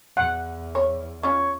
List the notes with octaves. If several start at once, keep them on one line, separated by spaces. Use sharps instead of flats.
E2 F#5
C#5
C#4 F4 C#5